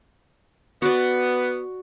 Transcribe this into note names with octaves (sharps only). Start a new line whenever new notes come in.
B3 F#4 D5